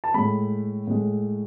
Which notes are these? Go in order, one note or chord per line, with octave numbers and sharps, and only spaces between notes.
A5
A2 G#3 B5
A2 G#3